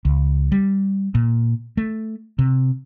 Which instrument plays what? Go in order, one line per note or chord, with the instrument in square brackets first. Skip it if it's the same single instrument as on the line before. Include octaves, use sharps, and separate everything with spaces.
[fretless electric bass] C#2
G3
A#2
A3
C3